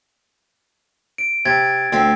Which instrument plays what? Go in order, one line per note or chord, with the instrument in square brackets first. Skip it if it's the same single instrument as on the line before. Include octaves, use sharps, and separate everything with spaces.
[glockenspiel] D7
[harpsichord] C3 [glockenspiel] G#6 A6
[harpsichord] D2 C4